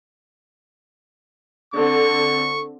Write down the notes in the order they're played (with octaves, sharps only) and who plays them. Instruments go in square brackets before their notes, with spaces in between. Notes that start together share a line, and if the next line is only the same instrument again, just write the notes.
[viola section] D3 C4 [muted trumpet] C#6